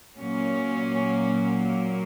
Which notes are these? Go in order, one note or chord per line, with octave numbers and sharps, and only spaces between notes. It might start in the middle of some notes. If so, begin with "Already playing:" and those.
A#2 F#3 A#3 C#4